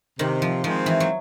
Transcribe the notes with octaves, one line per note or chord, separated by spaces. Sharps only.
C3 D#3
F3
D#3 F3 G#3 C4
E3
F#3